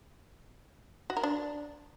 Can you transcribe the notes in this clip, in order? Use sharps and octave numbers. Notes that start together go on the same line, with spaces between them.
F#4
A#4
D4